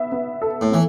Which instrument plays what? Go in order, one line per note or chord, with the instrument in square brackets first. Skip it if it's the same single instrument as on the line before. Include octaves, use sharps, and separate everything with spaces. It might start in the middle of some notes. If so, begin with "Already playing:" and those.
Already playing: [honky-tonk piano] B3 E5
B3
A4
[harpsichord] A2
[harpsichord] E3 [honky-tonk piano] B3